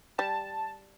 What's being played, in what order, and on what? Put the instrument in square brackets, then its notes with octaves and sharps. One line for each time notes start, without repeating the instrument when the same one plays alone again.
[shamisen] G3 [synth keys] A5